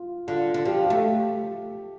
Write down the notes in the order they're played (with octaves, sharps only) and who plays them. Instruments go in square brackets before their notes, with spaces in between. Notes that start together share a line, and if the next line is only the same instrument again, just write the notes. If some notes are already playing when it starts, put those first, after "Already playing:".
Already playing: [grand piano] F4
[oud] D3 [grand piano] F4
[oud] D3
[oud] F3 [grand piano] G4
[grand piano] G4
[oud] A3